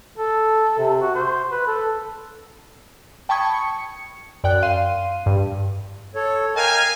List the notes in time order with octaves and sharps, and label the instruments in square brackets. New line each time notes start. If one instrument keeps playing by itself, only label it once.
[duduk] A4
C3
F#4
C5
B4
A4
[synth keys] G5 A5 B5 C#6 D#6 G#6
C#7
F#2 D5 G5 F#6
F5 C6 D#7
G2
[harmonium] A4 C#5
[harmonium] A#4 D#5 G5 [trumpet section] F5 G#5